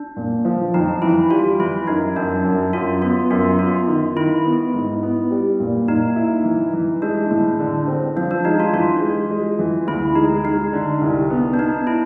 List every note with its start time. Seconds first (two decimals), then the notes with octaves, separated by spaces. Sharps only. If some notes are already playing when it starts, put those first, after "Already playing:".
Already playing: D4
0.17 A#2
0.45 F3
0.74 F2 D#4
1.02 E3 E4
1.31 G3 F4
1.59 E3 E4
1.87 F#2 D#4
2.16 F#2 D4
2.44 F#2
2.73 F#2 F4
3.02 B3 F4
3.30 F#2 F4
3.59 B3 F4
3.88 D#3
4.16 D#3 E4
4.44 B3
4.74 G#2
5.03 B3
5.30 G3
5.60 A#2
5.88 A#2 D#4
6.16 E4
6.44 E3
6.73 E3
7.02 G#3 D4
7.31 A2
7.59 D3
7.87 C4
8.16 F3 D4
8.31 D4
8.45 G#3 D#4
8.60 F4
8.73 E3 F4
9.02 G#3
9.31 G#3
9.59 E3
9.87 D2 E4
10.16 G#3 D#4
10.45 G#3 D#4
10.73 D3
11.01 C2
11.30 B3
11.54 D4
11.59 B3 D#4
11.87 E4